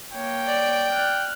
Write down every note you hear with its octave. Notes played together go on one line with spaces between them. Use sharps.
A#3 C#5 G5
D5
F6 F#6